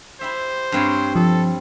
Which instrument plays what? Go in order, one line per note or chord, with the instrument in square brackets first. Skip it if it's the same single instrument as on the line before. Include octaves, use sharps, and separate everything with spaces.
[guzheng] E4 G4 E5 [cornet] C5
[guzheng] G2 C4 C#5
[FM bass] F3 [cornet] A4